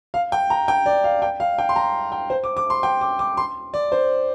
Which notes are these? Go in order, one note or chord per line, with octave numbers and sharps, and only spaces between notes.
F5
G5
A#5
G5
D5
F5
G5
F5
G5
C6
A#5
G5
C5
D6
D6
C6
G5
D6
D6
C6
D5
C5